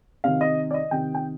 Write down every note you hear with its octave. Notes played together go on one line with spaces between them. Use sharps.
C3 D#3 F5
D#5
D5
D#5
C3 D#3 G5
G5